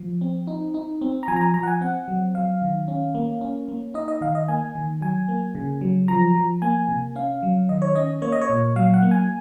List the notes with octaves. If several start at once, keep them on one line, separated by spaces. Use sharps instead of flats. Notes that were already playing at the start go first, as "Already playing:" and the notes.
Already playing: F3
C4
D#4
D#4
C4
A#5
F3 G#5
A#5
G#5
F3 A#5
F#5
G#5
C4 F#5
F#3
F#3 F5
D#3
C#4
A#3
C#4
A#3
D#4 D#5
D#5
D#3 F5
D#5
A#3 G#5
D#3
F#3 G#5
A#3
C#3
F#3
F3 A#5
F3
A#3 G#5
C3
C#4 F5
F#3
D#3 D#5
C#5
C#4 D#5
A#3 C#5
D#5
C#5
A#2
F#3 F5
F#5
A#3
G#5